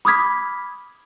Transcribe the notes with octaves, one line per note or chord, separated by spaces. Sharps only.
B5 D6 D#6 F6 G#6 B6